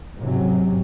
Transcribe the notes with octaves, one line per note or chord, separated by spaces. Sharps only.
G#2 C3 F#3 C#4